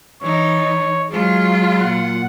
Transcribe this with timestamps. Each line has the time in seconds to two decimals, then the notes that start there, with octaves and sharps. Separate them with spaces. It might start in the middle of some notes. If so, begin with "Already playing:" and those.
0.21 E3 D#4 C#5
1.11 F#3 G#3 F4
1.81 A#2 F#5